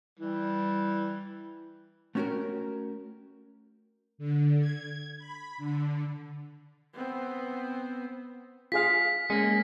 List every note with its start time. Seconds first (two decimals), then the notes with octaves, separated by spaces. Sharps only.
0.19 E3 G3
2.15 A3 B3 C#4 F#4 G4 A#4
4.18 D3
4.60 G#6
5.18 B5
5.58 D3
6.94 B3 C4
8.72 F4 G#4 F5 B6
9.30 G#3 A#3 C#4